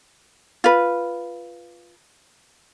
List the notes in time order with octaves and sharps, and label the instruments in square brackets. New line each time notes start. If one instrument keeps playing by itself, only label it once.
[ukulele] F4 B4